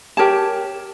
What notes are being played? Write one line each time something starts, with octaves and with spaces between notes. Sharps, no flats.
G4 A#4 C#5 A5